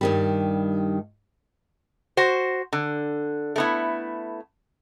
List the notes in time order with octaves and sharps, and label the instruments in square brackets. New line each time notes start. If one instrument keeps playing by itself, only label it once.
[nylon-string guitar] G2 D#3 G3
[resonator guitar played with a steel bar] F#4 C5
D3
A3 B3 E4